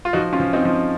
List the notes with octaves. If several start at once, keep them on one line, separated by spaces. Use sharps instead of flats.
F4
F3 D#4 F#4
C#4 F4
F3
C4 D#4
F3